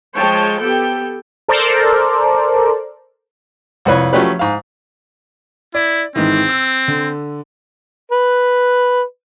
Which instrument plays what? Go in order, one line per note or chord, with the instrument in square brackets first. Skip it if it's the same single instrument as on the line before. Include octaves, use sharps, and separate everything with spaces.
[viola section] F3 G#3 C#5 G5 A5
B3 G4 A4 G5
[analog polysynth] A4 A#4 C5 D5
[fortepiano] C2 F2 B4 C#5
F3 F#3 A3 C#4 G4 B4
G#2 F5
[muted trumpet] E4 [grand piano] D5
[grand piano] G#2 D#3 E3 [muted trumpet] C4
[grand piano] E6
D3
[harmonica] B4